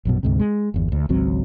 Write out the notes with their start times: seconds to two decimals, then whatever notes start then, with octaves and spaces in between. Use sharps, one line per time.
0.05 A#1 F#2 B2
0.23 D2 G#2 C3
0.39 G#3
0.74 G1 E2
0.92 D2
1.09 G#1 C#2 F#3 C4